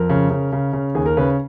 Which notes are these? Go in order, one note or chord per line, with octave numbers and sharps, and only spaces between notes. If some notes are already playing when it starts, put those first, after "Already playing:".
Already playing: F2 A#4
C#3
C#3
C#3
C#3
D#2 G#4
A#4
C#3 B4